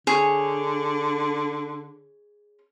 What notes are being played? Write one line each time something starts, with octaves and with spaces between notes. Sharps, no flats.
D3 G#4 C#5